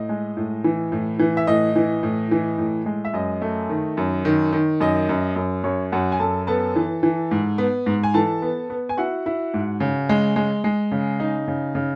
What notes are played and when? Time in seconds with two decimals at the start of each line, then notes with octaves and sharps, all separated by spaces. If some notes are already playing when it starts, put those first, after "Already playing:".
Already playing: A2 D#5
0.09 G#3
0.37 A2
0.64 E3
0.92 A2
1.19 E3
1.37 E5
1.47 A2 D#5
1.76 E3
2.03 A2
2.31 E3
2.58 A2
2.86 G#3
3.05 E5
3.14 F#2 D#5
3.42 A3
3.69 D#3
3.97 F#2
4.25 D#3
4.53 D#3
4.80 F#2 D#5
5.09 F#2
5.36 F#2
5.64 F#2 C#5
5.92 F#2 F#4 F#5
6.12 G#5
6.20 F#2 A4 A5
6.47 B3 A4 A5
6.76 E3
7.03 E3
7.31 G#2
7.58 B3
7.86 G#2
8.03 G#5
8.14 E3 A4 A5
8.42 B3
8.70 B3
8.89 G#5
8.97 E4 F#4 F#5
9.26 E4
9.54 G#2
9.80 C#3
10.09 G#3
10.36 G#3
10.64 G#3
10.92 C#3
11.20 D#4
11.48 C#3
11.75 C#3